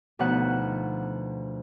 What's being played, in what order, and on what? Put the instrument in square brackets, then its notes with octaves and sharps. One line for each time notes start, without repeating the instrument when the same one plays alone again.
[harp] D2 B2 F3 D#4 F#5